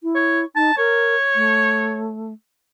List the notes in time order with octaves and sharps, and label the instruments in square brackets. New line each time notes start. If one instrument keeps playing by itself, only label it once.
[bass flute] E4
[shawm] C#5
[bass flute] D#4 [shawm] A5
[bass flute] A#4 [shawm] C#5
[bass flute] A3